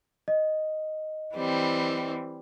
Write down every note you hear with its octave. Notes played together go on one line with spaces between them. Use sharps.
D#5
E3 G3 C4